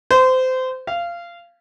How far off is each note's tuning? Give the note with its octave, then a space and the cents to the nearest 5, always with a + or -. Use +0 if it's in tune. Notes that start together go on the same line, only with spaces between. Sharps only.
C5 -25
F5 -20